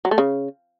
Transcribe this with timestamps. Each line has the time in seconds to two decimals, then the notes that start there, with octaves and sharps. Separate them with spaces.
0.05 F#3
0.11 A3
0.18 C#3